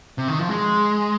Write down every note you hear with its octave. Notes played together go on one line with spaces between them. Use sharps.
C3
D#3
F3
G#3